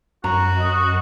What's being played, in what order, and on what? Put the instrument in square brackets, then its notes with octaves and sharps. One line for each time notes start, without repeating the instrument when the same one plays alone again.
[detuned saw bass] F#2 [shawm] F#4 [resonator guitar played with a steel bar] A#5
[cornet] D#5